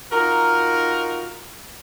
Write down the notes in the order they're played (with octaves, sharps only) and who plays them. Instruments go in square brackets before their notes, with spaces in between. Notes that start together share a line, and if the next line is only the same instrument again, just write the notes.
[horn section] D#4 F4 F#4 A#4